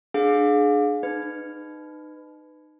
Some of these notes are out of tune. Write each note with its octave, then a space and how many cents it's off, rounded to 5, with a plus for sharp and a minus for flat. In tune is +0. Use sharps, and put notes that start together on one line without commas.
D4 +20 G#4 +20 F5 +35
D#4 -25 B4 +20